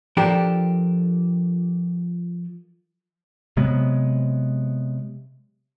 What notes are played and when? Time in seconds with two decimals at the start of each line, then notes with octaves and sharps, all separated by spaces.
0.17 F3 D4 G4 A4 A#4
3.57 C3 F#3 G#3 B3